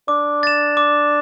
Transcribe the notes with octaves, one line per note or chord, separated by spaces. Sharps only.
D4 D6
A6 E7
D6